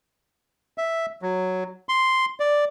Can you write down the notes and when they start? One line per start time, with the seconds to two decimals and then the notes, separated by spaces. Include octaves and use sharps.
0.78 E5
1.22 F#3
1.89 C6
2.40 D5